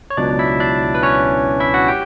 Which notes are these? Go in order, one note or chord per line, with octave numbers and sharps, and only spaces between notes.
C#5
C#2 B2 F#3 D4 D5
E4 E5
D4 D5
B4
C#4 C#5
E4 E5
F#4 F#5
G4 G5